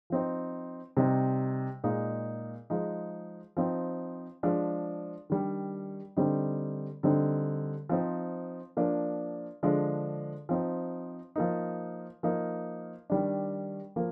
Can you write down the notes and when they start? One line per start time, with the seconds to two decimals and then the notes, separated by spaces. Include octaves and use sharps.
0.10 F3 C4 D#4
0.97 C3 G3 C4 D#4
1.84 A#2 G#3 D#4
2.70 F3 G#3 D#4
3.57 F3 C4 D#4
4.43 F3 G#3 D4
5.30 D#3 G3 D4
6.17 D3 G3 C4 D#4
7.03 D3 G3 C4 D#4
7.89 F3 C4 D#4
8.77 F3 A#3 D4
9.63 D3 F3 G#3 D4
10.49 F3 C4 D#4
11.36 F3 A#3 D#4
12.23 F3 A#3 D#4
13.10 D#3 G3 D4
13.96 F3 A#3